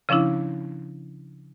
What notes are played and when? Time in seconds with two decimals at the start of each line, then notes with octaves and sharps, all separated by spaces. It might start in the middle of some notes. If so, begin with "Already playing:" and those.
0.09 C#3 F3 C#4 D4 E4